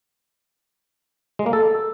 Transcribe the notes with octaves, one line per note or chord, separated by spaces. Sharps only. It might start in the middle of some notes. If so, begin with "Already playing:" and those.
G#3
A#3
A4